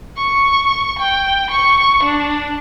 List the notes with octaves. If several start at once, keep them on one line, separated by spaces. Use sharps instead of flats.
C#6
G5
C#6
D4